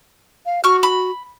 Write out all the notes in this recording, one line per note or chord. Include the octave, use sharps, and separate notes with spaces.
F5
F#4 C#6 F6
B5